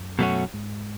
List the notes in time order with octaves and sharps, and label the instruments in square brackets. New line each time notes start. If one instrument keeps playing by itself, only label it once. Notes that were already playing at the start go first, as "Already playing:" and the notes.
Already playing: [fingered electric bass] F#2
[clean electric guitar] B2 F#3 A3 C#4 F#4
[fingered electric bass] G#2